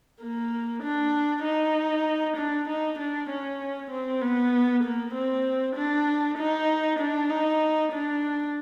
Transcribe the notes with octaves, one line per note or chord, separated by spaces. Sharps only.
A#3
D4
D#4
D4
D#4
D4
C#4
C4
B3
A#3
C4
D4
D#4
D4
D#4
D4